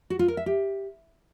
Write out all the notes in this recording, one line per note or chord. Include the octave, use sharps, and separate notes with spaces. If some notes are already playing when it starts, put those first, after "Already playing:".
F#4
F4
A#4
E5
G4